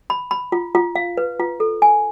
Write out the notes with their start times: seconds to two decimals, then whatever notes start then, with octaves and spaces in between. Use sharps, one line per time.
0.10 B5
0.31 B5
0.52 F4
0.75 F4
0.95 F5
1.17 B4
1.40 F4
1.60 A4
1.82 G#5